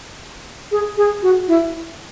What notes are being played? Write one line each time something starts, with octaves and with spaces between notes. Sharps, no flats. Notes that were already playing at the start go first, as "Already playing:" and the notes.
G#4
G#4
F#4
E4